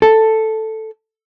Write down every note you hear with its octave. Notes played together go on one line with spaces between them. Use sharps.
A4